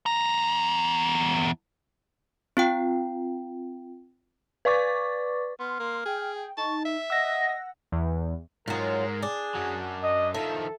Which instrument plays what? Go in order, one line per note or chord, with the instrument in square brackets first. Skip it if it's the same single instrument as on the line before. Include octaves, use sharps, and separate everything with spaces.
[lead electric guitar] E2 A#5
[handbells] C4 F4 G5
[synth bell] B4 D5 C#6 D6 A6
[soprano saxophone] B3 [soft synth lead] C6 [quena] F6
[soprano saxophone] A#3
[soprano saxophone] G#4 [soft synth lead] G5
[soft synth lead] D#4 [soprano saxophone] A5 [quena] C#6
[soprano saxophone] E5 [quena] E6
[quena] D#5 [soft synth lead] F#5 [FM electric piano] E6 A#6
[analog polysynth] E2
[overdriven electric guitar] G#2 G#3 [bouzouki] F#3 F4 [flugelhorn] A#4
[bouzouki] D4 [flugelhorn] G#4
[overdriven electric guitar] F#2 F#3
[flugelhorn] D#5
[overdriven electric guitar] D#3 F3 [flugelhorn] A4 [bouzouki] E5